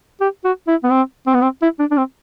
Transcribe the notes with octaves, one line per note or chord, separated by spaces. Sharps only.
G4
F#4
E4
B3
C4
C4
B3
C4
E4
D4
D4
C4